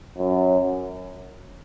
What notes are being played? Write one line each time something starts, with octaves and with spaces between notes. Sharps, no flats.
F#2